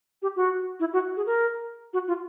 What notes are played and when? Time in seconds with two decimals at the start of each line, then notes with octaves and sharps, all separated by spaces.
0.22 G4
0.36 F#4
0.80 E4
0.93 F#4
1.17 G#4
1.26 A#4
1.93 F#4
2.07 F4